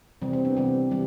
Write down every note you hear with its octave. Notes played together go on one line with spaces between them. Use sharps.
C3 E3 G3 C4
C4
B3 D4
C3 E3 G3 C4
C3 E3 G3